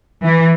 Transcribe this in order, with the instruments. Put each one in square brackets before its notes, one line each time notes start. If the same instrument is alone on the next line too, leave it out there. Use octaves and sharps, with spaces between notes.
[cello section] E3